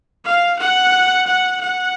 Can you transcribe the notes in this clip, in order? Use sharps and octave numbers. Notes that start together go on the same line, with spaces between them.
F5
F#5
F#5
F#5